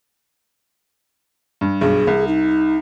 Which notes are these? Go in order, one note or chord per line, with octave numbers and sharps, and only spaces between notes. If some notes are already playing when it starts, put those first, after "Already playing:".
G2
B1 G2 G#4
C2
D#4